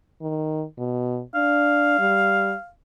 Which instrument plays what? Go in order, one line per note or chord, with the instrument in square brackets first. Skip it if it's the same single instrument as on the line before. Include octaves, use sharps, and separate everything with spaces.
[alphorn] D#3
B2
[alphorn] D4 [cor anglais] F5
[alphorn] G3